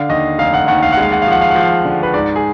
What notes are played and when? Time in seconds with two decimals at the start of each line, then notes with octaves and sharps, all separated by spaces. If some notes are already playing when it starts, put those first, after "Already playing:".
Already playing: D3 F5
0.09 D#2 D#5
0.39 F1 F5
0.53 F#5
0.68 D#2 F#5
0.82 F5
0.92 F#5
0.97 G#3 F5
1.12 F#5
1.22 F5
1.27 F3 F#5
1.41 F5
1.51 F#5
1.55 F3 F5
1.85 D3
2.03 B4
2.14 G#2 D5
2.36 G#4